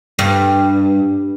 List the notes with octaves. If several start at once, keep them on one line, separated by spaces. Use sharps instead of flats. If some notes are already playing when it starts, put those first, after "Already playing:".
G2